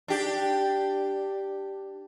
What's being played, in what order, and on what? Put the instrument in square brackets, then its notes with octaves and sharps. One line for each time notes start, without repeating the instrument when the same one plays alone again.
[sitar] D4 G4